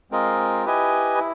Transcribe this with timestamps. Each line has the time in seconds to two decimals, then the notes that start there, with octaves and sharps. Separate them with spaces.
0.11 G#3 C4 F4 A#4 D#5
0.65 E4 G4 B4 D#5 G#5
1.19 E4